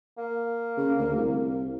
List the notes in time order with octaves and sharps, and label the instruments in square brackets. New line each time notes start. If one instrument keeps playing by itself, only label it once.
[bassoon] A#3
[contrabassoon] C#3
D2
C2